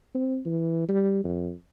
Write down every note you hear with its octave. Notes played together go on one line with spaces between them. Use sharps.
C4
E3
G3
F2